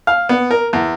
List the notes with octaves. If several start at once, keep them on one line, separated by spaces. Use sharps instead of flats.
F5
B3
A#4
E2